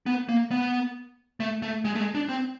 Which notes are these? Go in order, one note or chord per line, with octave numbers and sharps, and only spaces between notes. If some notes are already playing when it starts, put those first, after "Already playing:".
B3
A#3
B3
A3
A3
G#3
A3
G#3
D4
C4